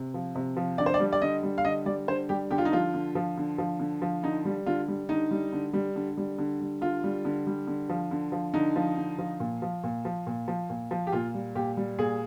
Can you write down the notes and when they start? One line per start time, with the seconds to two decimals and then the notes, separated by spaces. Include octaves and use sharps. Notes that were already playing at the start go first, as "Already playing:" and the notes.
Already playing: C3
0.14 F3
0.35 C3
0.57 F3
0.78 D3 D5
0.86 C5
0.94 D5
1.00 G3
1.13 D5
1.22 D3 D#5
1.43 G3
1.58 F5
1.65 D3 D#5
1.86 G3 D5
2.08 D3 C5
2.29 G3 G4
2.51 D3 G4
2.58 F4
2.65 D#4
2.72 F3 F4
2.94 D3
3.15 F3
3.38 D3
3.58 F3
3.80 D3
4.02 F3
4.23 D3 D#4
4.45 G3
4.66 D3 F4
4.88 G3
5.09 D3 D#4
5.31 G3
5.53 D3
5.73 G3
5.96 D3
6.17 G3
6.38 D3
6.61 G3
6.81 D3 F4
7.04 G3
7.25 D3
7.47 G3
7.67 D3
7.89 F3
8.11 D3
8.32 F3
8.54 D3 D#4
8.76 F3
8.97 D3
9.19 F3
9.40 A#2
9.62 F3
9.84 A#2
10.05 F3
10.27 A#2
10.48 F3
10.70 A#2
10.91 F3
11.07 G4
11.12 A#2 F4
11.34 G3
11.55 A#2 G4
11.77 G3
11.99 A#2 G#4